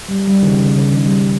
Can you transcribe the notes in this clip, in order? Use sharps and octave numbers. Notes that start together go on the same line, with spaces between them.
G3
G3
D#3
C#3
C#3
C#3
D#3
G3